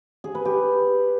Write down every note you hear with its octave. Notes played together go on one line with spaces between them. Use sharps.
G#4
B4
G4